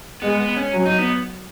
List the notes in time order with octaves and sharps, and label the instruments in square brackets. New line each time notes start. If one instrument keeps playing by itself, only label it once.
[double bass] G#3 [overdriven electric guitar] B3
[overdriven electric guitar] B3
C#4
[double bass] F#3
[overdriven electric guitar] D#4
B3